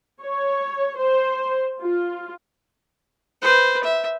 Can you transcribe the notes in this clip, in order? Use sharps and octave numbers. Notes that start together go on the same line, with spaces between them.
C#5
C5
F4
B4 C5
E5